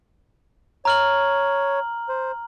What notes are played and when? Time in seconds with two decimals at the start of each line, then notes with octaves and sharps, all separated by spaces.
0.85 C#5 A#5 F6 F#7
2.09 C5